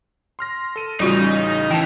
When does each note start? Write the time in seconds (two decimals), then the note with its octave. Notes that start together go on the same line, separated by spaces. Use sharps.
0.39 C6 F6 A#6
0.76 A4 D#7
1.00 A1 C#3 G3 D#4 F4 F#4
1.71 E3 G5 A5